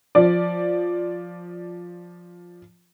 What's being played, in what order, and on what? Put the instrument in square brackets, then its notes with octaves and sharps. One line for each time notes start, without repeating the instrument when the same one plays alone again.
[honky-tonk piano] F3 D5